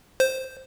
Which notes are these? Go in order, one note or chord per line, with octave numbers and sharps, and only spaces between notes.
C5